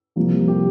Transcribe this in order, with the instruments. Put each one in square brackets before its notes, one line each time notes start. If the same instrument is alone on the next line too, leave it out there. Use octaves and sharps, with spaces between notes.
[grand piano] C2 C3 F3 A#3
G4